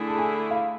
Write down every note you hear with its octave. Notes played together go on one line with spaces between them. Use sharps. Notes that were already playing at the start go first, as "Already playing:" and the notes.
Already playing: D3 A3 E4 G#4
A5
G#5
F5